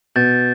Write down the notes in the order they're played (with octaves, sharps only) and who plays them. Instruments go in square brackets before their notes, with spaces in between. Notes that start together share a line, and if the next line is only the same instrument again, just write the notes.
[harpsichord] B2 [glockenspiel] G6 A6